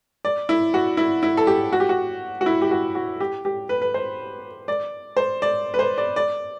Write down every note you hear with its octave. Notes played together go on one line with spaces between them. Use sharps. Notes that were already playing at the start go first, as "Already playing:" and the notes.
D5
E4
F#4
E4
E4
A4
G4
F#4
G4
F#4
F#4
E4
G4
F#4
F#4
G4
G4
B4
B4
C5
D5
C5
D5
B4
C5
D5
D5